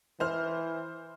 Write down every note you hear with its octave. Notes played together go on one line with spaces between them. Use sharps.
E3 C5 F6